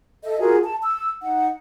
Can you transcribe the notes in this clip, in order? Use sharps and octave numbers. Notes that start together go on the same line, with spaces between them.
A4 D#5 E5
F4 F#4 G#4 A#4
A5
E6
D#4 F#5